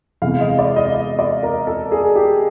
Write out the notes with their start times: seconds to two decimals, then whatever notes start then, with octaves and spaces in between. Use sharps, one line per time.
0.22 C3 E3 G#3 B3 F5
0.40 D#5
0.59 D5
0.76 D#5
0.94 D#5
1.19 D5
1.43 A#4
1.67 A4
1.92 G#4
2.15 G4